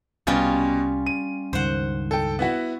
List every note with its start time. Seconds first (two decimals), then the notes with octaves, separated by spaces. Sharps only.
0.27 C2 B2 G3 C#4 F4
1.06 D#7
1.53 C#2 G2 D#3 C5 F#5
2.11 A4 G5
2.39 B3 E4 F#4